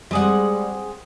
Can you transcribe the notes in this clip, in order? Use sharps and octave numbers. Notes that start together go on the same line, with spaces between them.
G3 G#3 C4 G#4 F#5